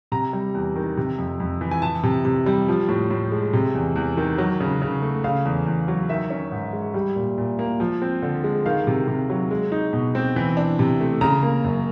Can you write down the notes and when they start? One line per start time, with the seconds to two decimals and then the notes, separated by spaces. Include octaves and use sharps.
0.12 C3 A#5
0.33 G3
0.54 E2
0.76 D#3
0.97 C3
1.18 F2
1.40 F2
1.61 E3
1.71 G#5
1.82 E3 A5
2.03 C3
2.25 C3
2.46 G3
2.68 F3
2.89 A2
3.10 A2
3.32 G#3
3.53 C3
3.75 E2
3.96 E2
4.17 D#3
4.38 F#3
4.60 C#3
4.82 C#3
5.02 A3
5.24 C#3 F5
5.45 E2
5.66 E2
5.88 F#3
6.09 D#3 E5
6.30 C#4
6.52 G#2
6.73 G#3
6.94 G3
7.16 A#2
7.38 A#2
7.59 A#3
7.80 F3
8.02 C4
8.22 D3
8.44 G#3
8.66 D#3 F5
8.87 C3
9.08 C3
9.30 F#3
9.51 G#3
9.72 D#4
9.93 B2
10.15 C4
10.36 E3
10.57 D4
10.79 C3
11.00 A3
11.21 C#3 A#5
11.43 A#3
11.64 F#2